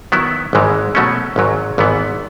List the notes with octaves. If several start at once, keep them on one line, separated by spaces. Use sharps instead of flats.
D#3 F#3 B3 E4
G#1 G#2 E3 G#3
B2 F#3 A3 C#4
G#1 G#2 F#3
G#1 G#2 E3 B3